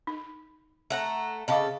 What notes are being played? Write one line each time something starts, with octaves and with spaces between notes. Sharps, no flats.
D#4
A3 F#5 A#5
C#3 A4 D#5 F5 D6